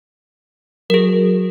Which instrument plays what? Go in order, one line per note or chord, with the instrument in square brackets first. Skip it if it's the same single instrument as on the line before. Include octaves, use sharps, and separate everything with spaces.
[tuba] F#3 [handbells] G#4 A#4